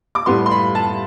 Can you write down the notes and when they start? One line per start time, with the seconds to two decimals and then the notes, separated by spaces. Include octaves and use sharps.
0.15 D6
0.26 A2 G3 B3 C6
0.46 C6
0.51 B5
0.75 A5